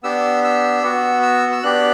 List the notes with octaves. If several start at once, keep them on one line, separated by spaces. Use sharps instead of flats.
B3 D4 G4 E6
E6
B3 F#4
E6
E6
B3 D4 G4 F#6